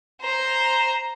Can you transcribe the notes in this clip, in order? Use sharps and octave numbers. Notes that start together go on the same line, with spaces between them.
C5 A#5